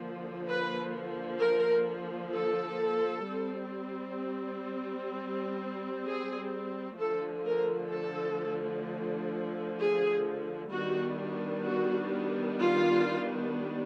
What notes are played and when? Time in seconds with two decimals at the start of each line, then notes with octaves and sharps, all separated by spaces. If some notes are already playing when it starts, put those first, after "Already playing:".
Already playing: D3 F3 A#3
0.47 B4
1.40 A#4
2.33 A4
3.26 G3 C4
6.06 G#4
6.99 D3 F3 A3 A4
7.45 A#4
7.92 A4
9.79 G#4
10.72 D#3 G3 B3 D4 F#4
11.66 F#4
12.59 F4